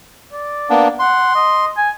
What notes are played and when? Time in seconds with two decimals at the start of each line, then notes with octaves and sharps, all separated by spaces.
0.33 D5
0.70 A#3 B3 D4
1.00 F#5 C6
1.35 D#5
1.77 G#5